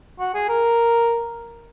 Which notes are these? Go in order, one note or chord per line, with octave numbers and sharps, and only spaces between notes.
F#4
G#4
A#4